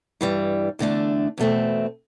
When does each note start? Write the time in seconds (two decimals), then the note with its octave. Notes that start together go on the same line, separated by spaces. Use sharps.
0.21 G2 E3 G3
0.79 E2 D3 A3 D4
1.38 E2 B2 A3 C4